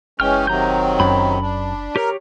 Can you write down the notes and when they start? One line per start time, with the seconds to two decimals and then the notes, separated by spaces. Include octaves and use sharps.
0.20 F#1 E3 G#3 C#4 G5 F6
0.47 C3 D#3 F#3 A#5 G6
1.00 F#2 B5
1.41 D4
1.96 G4 A#4 C#5